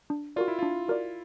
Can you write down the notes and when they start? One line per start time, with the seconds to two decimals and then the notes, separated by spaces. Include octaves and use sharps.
0.10 D4
0.36 F4 F#4 A#4 D5
0.48 E4
0.59 D4 F4
0.88 F#4 A#4 D5